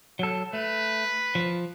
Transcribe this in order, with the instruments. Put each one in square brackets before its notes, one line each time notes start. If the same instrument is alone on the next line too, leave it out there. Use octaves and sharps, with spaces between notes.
[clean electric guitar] F#3 A4
[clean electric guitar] A3 [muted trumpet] B4
[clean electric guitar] F3